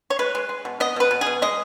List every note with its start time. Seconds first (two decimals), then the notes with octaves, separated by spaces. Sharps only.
0.10 C#5
0.19 G#3 B4
0.35 G#3
0.49 G#3
0.65 B2
0.80 B3 D#5
0.96 B2 B4
1.11 B2
1.21 G#4
1.26 B2
1.42 G#3 D#5